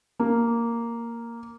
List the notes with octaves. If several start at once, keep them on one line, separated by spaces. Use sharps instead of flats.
A#3